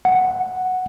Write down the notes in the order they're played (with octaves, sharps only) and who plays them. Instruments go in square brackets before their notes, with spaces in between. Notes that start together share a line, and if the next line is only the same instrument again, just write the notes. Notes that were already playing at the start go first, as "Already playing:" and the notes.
[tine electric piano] F#5